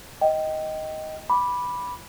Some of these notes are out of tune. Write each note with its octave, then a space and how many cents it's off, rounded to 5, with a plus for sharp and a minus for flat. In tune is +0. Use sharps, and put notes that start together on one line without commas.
D#5 +10 G5 -10
B5 -5 D6 +0